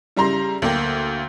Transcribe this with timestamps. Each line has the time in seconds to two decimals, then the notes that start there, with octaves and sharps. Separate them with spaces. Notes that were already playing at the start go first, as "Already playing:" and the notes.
0.17 C#3 G3 E4 A#5 C6 A#6
0.62 D2 A#3 G5